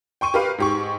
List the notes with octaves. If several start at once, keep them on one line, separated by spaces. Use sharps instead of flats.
G5 C6 C#6 D#7
G4 A#4 B4 F5
G#2 G4 C#6